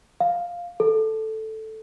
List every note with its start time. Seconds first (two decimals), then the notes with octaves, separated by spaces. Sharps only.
0.20 F5
0.80 A4